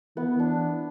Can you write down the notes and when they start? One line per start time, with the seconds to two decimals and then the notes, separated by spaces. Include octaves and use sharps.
0.16 E3 B3
0.39 D4